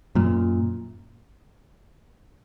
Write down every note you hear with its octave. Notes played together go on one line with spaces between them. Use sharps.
F#2 A#2